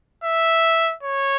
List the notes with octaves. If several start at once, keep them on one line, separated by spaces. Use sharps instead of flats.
E5
C#5